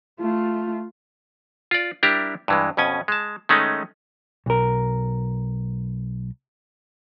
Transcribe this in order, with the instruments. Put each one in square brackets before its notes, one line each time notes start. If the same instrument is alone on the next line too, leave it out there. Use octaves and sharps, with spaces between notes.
[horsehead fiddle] A3 F4
[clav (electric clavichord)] F4 D5
G3 D4 E4 G4 A#4 A#5
G2 E3 G#3
F2 B2 C#4 G#5
G#3 A5
D#3 G#3 A3 C#4 D#4
[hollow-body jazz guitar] B1 A#4